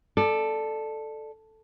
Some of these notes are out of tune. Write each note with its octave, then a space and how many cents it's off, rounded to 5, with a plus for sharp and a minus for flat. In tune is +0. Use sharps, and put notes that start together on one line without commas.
A4 +0 D5 +20